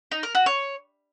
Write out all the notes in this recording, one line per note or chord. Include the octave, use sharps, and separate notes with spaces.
D#4
A#4
F#4
C#5